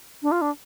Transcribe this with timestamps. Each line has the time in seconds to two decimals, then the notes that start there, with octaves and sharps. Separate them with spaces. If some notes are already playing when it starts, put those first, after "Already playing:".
0.22 D4
0.32 F4
0.41 D4